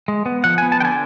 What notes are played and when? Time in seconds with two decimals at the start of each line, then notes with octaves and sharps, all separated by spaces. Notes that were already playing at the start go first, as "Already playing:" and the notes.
0.08 G#3
0.26 B3
0.44 F3 F#5
0.58 B3 G#5
0.72 A5
0.80 D3 G5 G#5